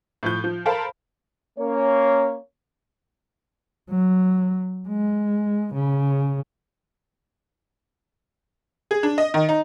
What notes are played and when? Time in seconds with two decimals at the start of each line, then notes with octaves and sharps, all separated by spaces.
0.23 A2 F3 G6
0.44 F3
0.65 A4 A#4 C5 F5 A5 B5
1.59 A#3 C#4 C#5
3.90 F#3
4.88 G#3
5.73 C#3
8.91 G#4
9.03 D4
9.18 D#5
9.34 D#3
9.49 D#4